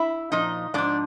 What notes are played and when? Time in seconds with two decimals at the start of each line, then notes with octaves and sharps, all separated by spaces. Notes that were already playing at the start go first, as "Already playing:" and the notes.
Already playing: E4 E5
0.32 A#2 F3 D#4 D#5
0.74 G#2 F3 D4 D5